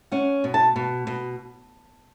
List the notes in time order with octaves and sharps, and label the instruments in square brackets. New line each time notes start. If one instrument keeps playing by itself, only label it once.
[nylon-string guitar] C#4 F#5
B2
A5
B2
B2